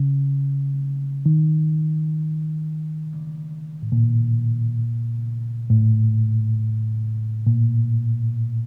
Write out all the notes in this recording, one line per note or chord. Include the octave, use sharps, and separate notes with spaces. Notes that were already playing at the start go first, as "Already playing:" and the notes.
Already playing: C#3
D#3
A2
A#2
A2
A#2